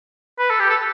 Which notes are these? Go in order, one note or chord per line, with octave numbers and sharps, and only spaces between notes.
B4
A4
G4
A4